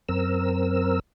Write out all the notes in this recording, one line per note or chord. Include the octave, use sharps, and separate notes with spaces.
F#2 C4 A#4 E6